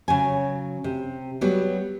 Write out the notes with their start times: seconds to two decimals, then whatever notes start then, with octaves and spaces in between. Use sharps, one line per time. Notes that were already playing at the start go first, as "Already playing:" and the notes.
0.08 C#3 F#3 G#5
0.84 C3
1.41 F#3 G3 B3